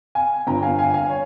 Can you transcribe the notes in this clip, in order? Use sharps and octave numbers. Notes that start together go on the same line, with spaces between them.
F5 G#5
G1 G2 F3 G5 A#5
F5 G#5
F5 G#5
F5 G#5
C#5